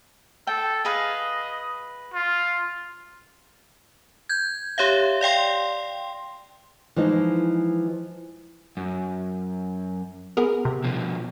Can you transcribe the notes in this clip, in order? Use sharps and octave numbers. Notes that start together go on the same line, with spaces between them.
A4 G5
G#4 B4 D#5 F5
F4
G6 G#6
G4 C#5 E5 F5
D5 F5 G5 C6
E3 F3 G#3 D#4
F#2
B3 G#4 A#4
C3
B2 F3